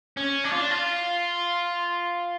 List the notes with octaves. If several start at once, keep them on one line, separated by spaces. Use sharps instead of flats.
C#4
D4
F4
D4
F4